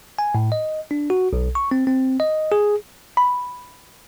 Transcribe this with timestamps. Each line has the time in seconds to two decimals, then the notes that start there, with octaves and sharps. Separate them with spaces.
0.19 G#5
0.35 A2
0.52 D#5
0.91 D4
1.10 F#4
1.33 B1
1.55 C#6
1.71 C4
1.87 C4
2.20 D#5
2.52 G#4
3.17 B5